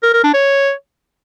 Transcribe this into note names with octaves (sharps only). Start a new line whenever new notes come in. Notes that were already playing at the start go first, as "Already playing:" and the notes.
A#4
A#4
D4
C#5